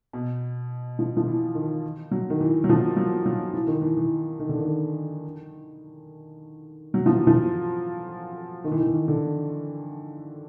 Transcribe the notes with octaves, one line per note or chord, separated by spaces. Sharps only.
B2
F3
F3
E3
D#3
F#3
D#3
E3
F#3
F3
F#3
F#3
E3
D#3
E3
E3
D#3
D3
D#3
F#3
F3
E3
F3
D#3
E3
D#3
E3
D#3
D3